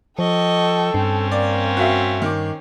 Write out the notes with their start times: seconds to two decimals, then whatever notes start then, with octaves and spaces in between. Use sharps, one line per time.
0.19 F3 A4 D#5 G5 C#6
0.94 G2 C4 C#4
1.32 A#3 D5
1.77 F#4 E5 F5
2.22 D#3 D6